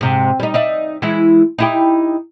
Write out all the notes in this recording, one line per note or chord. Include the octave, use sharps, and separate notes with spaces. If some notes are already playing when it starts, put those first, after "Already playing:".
G#2 C3
G3 D#4
D#4 D5 E5
E3 G#3 E4
D#4 E4 G4